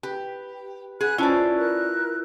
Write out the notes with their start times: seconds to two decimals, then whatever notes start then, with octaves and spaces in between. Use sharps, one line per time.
0.03 G4 B4
1.01 G#4 F#5 B5 F#6
1.18 C#4 E4 F4 B4 C5 D5 A5
1.58 A#4 F#6